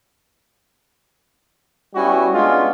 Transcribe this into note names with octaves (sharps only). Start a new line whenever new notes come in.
G3 B3 C#4 E4 F#4
G#3 B3 C#4 D4 F4